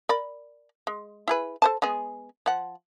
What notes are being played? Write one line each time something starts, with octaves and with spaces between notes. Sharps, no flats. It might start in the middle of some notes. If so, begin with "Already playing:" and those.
A#4 D5 B5
G#3
E4 G#4 B4
A4 C5 A5
G#3 B3 G#4
F3 F#5